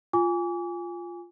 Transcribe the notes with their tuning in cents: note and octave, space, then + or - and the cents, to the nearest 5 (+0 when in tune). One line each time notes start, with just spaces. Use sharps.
F4 +0 G#5 -10 D6 -40